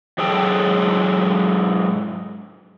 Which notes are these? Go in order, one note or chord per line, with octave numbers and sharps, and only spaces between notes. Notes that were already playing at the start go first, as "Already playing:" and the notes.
G#2 F#3 G#4 A4 G5